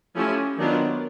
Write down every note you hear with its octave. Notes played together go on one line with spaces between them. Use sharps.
F3 A3 C#4 E4 G4
D#3 F#3 B3 D4 F4